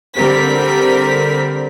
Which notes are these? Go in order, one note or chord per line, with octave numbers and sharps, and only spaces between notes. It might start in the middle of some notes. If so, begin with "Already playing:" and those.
D3 G3 C4 A#4 B6